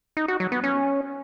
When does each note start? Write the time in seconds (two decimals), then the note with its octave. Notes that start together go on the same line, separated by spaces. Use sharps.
0.17 D#4
0.28 F#4
0.40 F#3
0.52 B3
0.63 C#4